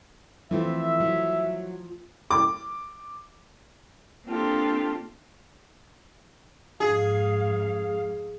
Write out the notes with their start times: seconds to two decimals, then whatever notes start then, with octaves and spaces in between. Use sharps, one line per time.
0.51 E3 F3 A3 C4 E5
1.00 F#3
2.31 D6
4.26 A#3 C4 D4 F4 G4 A4
6.80 F2 G#2 G#4 F5